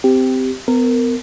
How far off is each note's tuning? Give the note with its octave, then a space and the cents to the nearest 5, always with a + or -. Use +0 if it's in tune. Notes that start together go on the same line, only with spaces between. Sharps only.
C4 -20 G4 +0
B3 +30 A#4 -20